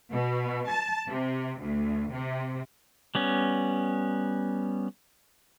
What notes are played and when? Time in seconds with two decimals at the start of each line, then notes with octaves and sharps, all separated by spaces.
0.11 B2
0.69 A5
1.07 C3
1.61 D2
2.12 C3
3.15 G3 B3 C#4